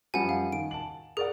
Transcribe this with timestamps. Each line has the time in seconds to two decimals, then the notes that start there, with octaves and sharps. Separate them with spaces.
0.14 F#2 F3 G3 F#5 G#5
0.29 F5
0.52 D#3 D7
0.71 A5 F#7
1.17 G#4 A#4 D5 F#5